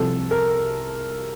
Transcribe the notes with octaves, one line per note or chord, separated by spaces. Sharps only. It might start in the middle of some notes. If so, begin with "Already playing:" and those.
Already playing: C2 C3 F3 A4
A#4